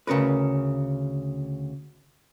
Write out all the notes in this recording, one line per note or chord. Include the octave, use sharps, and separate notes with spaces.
D2 C#3 C#4 A#4 B4